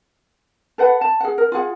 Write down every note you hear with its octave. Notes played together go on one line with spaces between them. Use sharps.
A4 B4 F#5
A5
G#4 F#5
A#4
F4 G#4 F#5